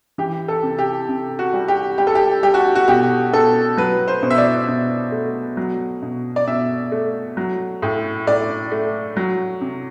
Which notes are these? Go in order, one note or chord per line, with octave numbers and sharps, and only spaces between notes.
E3 G4
A4
C3
G4
C3
F#4
G3
G4
G3 G4
A4
G4
G3 G4
F#4
F#4
B2 G4
B2 A4
F#3 B4
C5
B2
E5
D5
B2
A3
F#3
B2
D5
B2 E5
A3
F#3
A2
A2 D5
A3
F#3
C3